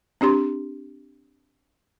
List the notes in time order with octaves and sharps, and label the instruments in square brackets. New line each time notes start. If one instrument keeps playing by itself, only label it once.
[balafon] C4 D4 G4 C6